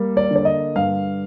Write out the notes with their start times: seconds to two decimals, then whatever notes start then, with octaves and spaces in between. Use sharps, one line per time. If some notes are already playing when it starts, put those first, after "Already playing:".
Already playing: G3 A#3
0.17 D5
0.31 D3 D5
0.45 D#5
0.76 G2 F5